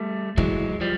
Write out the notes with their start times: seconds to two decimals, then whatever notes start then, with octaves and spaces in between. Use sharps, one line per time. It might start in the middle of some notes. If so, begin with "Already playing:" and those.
Already playing: G3 A3
0.37 E3 F#3 G#3
0.81 F3 G3